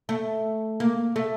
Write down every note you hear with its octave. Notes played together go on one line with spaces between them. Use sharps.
A3
A#3
A3